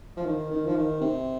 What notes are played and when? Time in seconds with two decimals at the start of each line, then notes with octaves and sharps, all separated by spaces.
0.17 F3
0.25 D#3
0.51 D#3
0.66 F3
0.76 D#3
1.01 C3